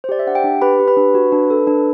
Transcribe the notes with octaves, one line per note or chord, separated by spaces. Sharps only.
C5
G4 D5
E5
D4 F#5
G4 G5
D4
G4 B4 B5
G4
B4 B5
D4
F#4
D4
A4
D4